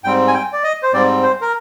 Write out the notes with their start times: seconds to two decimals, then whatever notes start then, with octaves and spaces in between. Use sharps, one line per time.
0.04 G#2 G3 C4 G5
0.28 G#5
0.34 G5
0.53 D5
0.64 D#5
0.83 C5
0.93 G#2 G3 C4 D5
1.23 C5
1.41 A#4